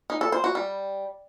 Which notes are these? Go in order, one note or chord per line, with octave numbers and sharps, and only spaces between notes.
D#4
A4
C5
F#4
G3